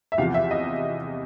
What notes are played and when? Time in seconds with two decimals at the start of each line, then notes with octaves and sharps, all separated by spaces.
0.12 E5
0.18 E2 C3 F3 F5
0.34 E5
0.51 D#5